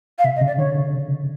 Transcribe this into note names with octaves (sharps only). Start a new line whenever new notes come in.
F5
C3 E5
D#5
C#3
D5
D3 C#5